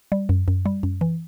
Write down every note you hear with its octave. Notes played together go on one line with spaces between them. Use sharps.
G3
F#2
F#2
G3
F#2
E3